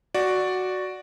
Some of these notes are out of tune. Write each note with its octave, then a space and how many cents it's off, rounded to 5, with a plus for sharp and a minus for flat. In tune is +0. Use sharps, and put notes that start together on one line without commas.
F#4 +0 D5 +0